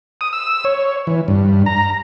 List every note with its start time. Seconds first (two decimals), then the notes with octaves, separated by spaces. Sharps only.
0.21 D#6
0.33 E6
0.65 C#5
1.07 E3
1.28 G2
1.66 A#5